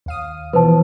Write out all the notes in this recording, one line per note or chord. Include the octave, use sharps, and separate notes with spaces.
D#2 F5 D#6
B2 E3 F3 B4 C5 A5